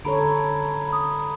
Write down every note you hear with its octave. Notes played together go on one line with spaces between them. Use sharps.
D3 A4 C#5 A#5 B5 D7
B5 D#6